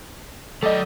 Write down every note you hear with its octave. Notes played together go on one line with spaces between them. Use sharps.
F#3 A4 D5 D#5